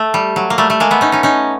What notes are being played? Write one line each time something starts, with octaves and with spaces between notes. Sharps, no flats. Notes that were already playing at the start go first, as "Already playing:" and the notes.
Already playing: A3
G3
F#3
A#3
G3 A3
A3
G#3 A#3
A3 B3
C#4 D#4
C#4 D#4
C#4 D#4